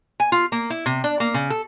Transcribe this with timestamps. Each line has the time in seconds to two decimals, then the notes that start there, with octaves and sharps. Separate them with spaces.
0.20 G#5
0.32 F4
0.52 A#3
0.70 E4
0.86 C3
1.04 D4
1.20 A#3
1.34 C#3
1.50 A4